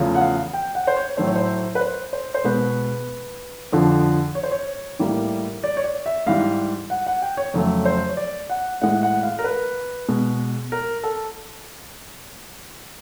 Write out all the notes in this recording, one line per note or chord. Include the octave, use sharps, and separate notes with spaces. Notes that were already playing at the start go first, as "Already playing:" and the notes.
Already playing: E2 C#3 F3 A3
F#5
F5
G5
F#5
C5
C#5
A2 F#3 A3 C5
C#5
C5
B4
C5
C5
C5
B2 G#3 B4
F2 D3 F3
C#5
C5
C#5
A2 E3 G3 A#3
D5
C#5
D5
E5
G#2 E3 G3 F5
F#5
F#5
G5
C#5
F2 C#3 F#3 A3
C5
C#5
D5
F#5
A2 E3 G#3 F#5
F#5
F5
A#4
B4
B2 G#3
A#4
A4